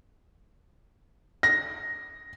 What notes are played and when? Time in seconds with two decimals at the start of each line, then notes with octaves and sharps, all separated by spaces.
1.43 A#6